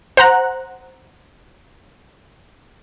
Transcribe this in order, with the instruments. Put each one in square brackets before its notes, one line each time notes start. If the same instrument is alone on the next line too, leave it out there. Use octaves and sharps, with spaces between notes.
[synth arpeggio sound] C5 F#5 A#5 F#6